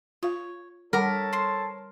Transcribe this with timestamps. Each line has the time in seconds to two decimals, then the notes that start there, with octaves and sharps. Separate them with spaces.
0.23 F4 C#5 F5
0.93 G3 A4 A#4 C#5 F#5 A5 B5 D6
1.33 C5 C6